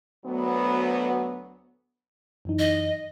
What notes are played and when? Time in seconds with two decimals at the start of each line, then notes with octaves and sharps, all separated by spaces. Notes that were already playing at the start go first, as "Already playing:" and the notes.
0.24 D2 F#3 B3
2.45 F#2 E3 D#4
2.59 D#5